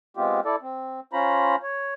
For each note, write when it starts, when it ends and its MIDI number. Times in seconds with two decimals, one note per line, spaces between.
0.17 0.40 56
0.17 0.40 59
0.17 0.40 60
0.17 0.40 65
0.17 0.40 67
0.45 0.56 64
0.45 0.56 69
0.45 0.56 74
0.62 1.00 60
1.13 1.56 61
1.13 1.56 65
1.13 1.56 72
1.13 1.56 82
1.13 1.56 83
1.63 1.94 73